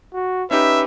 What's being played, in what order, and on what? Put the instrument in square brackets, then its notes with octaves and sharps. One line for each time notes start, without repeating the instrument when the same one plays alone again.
[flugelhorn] F#4
[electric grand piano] C#4 D#4 G4 [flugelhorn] B4 [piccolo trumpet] E5